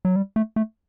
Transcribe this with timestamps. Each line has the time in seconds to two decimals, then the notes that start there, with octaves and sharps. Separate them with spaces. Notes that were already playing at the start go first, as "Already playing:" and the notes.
0.05 F#3
0.16 G3
0.36 A3
0.56 A3